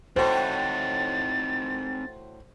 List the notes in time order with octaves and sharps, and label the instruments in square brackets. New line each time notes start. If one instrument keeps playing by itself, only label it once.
[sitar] A2 F#4 [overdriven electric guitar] C4 D#4 [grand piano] C5 [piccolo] A6